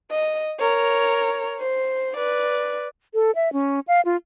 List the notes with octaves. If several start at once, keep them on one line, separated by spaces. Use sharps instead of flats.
D#5
A#4 C#5
C5
B4 D5
A4
E5
C#4
F5
F4